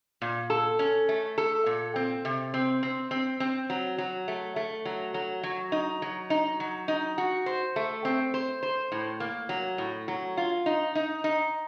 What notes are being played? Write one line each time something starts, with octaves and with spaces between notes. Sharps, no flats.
A#2
A4
C#4
A3
A4
A#2
C4
C3
C4
C4
C4
C4
F#3
F#3
A3
A3
F#3
F#3
F#3
D#4
F#3
D#4
F#3
D#4
F#4
C5
A3
C4
C5
C5
A2
A#3
F#3
A2
F#3
F4
D#4
D#4
D#4